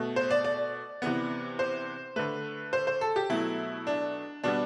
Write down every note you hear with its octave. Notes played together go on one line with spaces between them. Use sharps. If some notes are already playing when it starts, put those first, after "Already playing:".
Already playing: B2 A3
C5
D5
D5
C3 E3 B3
C5
D3 A3 B4
C5
C5
A4
G4
B2 F#3 A3 E4
D4
B2 G3 B3 D4